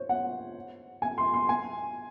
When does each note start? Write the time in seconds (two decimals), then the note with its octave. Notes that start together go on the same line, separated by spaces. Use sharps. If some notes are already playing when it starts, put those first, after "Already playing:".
Already playing: C5 C#5
0.09 F#5
1.02 G#5
1.18 C6
1.34 C6
1.49 G#5